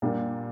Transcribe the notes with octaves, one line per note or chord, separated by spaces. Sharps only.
A#2 G3 A#3 D4